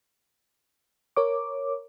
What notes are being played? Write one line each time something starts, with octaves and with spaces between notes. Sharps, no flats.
A#4 C#5 D6